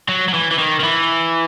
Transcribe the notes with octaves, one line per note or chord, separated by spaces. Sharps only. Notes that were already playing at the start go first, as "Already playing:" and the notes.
F#3
F#3
E3
E3
D#3
D#3
E3